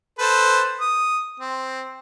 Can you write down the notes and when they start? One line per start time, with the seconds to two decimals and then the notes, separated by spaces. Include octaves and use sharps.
0.19 A4 B4 C5
0.80 D#6
1.40 C4